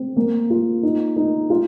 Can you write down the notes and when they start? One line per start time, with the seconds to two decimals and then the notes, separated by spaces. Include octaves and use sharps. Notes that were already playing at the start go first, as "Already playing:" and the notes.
Already playing: C4
0.17 A#3
0.50 F4
0.83 D#4
1.16 D#4
1.50 F4